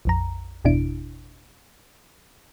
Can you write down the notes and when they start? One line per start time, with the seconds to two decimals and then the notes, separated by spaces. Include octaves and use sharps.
0.05 A#1 F2 A#5
0.65 G1 E2 B2 D4 E4 D7